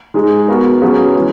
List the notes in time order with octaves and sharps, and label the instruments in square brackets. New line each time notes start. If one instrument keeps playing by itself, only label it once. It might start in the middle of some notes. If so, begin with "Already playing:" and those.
[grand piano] G#3 D#4 G#4
B3 F#4 A#4
F#3 C#4 G#4 B4
E3 G#3